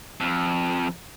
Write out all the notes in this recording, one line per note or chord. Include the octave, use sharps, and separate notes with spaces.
F2